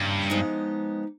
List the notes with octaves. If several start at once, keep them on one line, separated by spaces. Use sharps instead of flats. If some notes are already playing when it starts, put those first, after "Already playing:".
Already playing: G2 C#3 E3 G3 A#3
F3 G#3 B3 D#4 G4